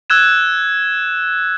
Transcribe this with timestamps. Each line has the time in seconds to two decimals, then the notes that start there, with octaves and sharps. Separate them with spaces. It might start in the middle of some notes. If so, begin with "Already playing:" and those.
0.10 E6 F#6 G#6 E7